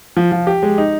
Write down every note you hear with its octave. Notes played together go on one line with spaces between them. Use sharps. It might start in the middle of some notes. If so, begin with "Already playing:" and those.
F3
F3
G4
G#3
D#4